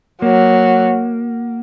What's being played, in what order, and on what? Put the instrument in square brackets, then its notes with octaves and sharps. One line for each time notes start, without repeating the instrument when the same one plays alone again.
[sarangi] F#3 [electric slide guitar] A#3